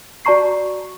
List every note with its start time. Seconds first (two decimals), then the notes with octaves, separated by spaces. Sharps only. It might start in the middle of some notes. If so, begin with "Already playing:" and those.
0.25 F#4 D5 A5 A#5 C#6 C7